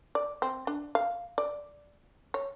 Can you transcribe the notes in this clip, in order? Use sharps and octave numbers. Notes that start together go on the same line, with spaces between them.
D5
C4
D4
F5
D5
C#5